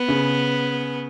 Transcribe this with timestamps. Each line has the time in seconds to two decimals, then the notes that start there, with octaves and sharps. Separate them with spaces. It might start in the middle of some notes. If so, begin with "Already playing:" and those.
Already playing: B3
0.08 C#3